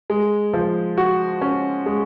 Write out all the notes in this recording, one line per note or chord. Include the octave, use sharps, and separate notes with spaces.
G#3
F3
F#4
C#4
G#3